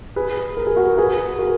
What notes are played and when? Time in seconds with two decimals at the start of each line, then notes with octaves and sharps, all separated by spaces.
0.16 G#4 B4
0.57 A#4
0.67 G#4
0.76 F#4 A#4
0.88 A#4
0.98 G#4 B4
1.38 F#4 A#4